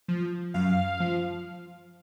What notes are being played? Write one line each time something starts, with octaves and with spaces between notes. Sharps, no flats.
F3
F#2 F5
F3